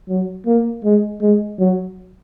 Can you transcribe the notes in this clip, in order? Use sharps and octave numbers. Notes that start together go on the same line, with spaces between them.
F#3
A#3
G#3
G#3
F#3